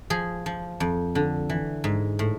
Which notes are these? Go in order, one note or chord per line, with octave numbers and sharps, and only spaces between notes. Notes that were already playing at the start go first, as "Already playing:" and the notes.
F3 G#4
F3
F2
D3
E3
G#2
A2